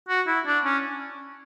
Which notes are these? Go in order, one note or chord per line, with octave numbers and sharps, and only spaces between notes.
F#4
E4
D4
C#4